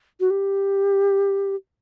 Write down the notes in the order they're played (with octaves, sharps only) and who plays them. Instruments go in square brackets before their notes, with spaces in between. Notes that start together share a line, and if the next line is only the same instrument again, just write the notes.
[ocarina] F#4
G4